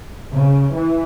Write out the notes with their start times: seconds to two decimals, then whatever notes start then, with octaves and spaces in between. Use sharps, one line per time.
0.30 C#3
0.72 E3